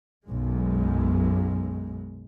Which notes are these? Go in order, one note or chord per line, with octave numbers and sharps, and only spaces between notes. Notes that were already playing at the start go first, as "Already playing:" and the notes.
B1 F#2 G#3